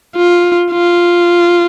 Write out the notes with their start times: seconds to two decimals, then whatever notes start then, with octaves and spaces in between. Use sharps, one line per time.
0.16 F4
0.72 F4